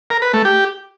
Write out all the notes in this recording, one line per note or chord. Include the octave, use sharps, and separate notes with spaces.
A#4
B4
A3
G4